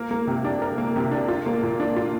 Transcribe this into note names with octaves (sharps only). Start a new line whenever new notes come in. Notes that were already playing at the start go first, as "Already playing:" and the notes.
Already playing: A#3 A#4
A#3
C3
D4
A#4
A#3
C3
D4
F4
A#3
A#2
D4
F4